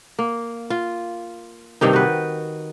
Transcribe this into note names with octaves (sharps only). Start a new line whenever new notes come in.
A#3
F4
G2 C3 D#3 D#4
F#4 B4